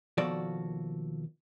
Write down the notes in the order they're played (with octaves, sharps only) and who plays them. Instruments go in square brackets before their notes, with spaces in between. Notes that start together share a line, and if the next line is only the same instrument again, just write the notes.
[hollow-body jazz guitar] D#2 B2 F3 F#4 A4 D5